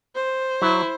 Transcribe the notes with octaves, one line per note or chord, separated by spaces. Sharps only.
C5
F#3 E4